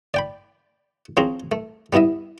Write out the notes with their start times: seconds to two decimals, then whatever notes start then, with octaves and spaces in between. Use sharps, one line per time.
0.14 D5 G5 B5
1.17 F3 C4 C#4 G#4 A#5
1.52 A3
1.93 G3 B3 E4 D#5 E5